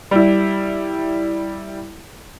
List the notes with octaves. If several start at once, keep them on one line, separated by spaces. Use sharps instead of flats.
G3 E4